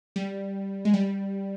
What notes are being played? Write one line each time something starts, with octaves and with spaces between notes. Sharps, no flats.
G3
G#3
G3